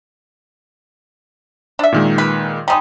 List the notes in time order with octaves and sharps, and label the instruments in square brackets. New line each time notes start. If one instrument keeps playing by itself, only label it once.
[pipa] D4 E5
[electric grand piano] A#2 D#3 G#3
[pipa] B4
[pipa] G3 G#3 D#4 [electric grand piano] A#5 D#6